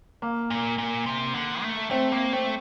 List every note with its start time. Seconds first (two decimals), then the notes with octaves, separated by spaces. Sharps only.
0.22 A#3
0.50 A#2
0.78 A#2
1.06 C3
1.34 D3
1.62 A3
1.91 A3 C4
2.12 A#3
2.33 A3 C4